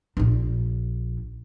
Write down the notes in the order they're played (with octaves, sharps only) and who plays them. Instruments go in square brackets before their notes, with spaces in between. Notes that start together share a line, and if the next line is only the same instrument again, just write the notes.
[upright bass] A#1 D4